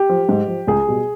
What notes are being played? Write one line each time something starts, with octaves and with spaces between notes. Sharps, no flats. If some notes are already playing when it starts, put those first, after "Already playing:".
Already playing: G4
F3
G#2
F3
C#2 G#4
B2 G3